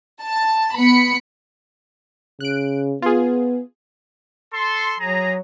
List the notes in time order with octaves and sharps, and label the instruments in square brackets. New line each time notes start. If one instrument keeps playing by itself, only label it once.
[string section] A5
B3 B5 B6 C#7
[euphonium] C#3 [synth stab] F#6 D7
[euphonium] B3 [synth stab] F4 G#4
[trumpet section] A4 C6
[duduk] F#3 [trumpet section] G#4 A#5